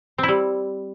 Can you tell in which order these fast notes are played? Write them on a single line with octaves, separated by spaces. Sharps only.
C4 E4 G3